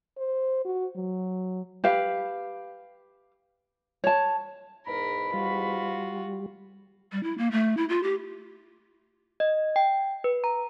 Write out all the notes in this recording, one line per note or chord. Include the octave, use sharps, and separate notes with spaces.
C5
F#4
F#3
G4 B4 F5
C#5 A5
E2 G#2 A#4 B5
G3 F4 F#4
G3
E4
A#3
A3
E4
F4
G4
D#5
G5
B4
A#5